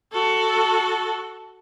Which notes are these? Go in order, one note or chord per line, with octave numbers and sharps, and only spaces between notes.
F#4 A4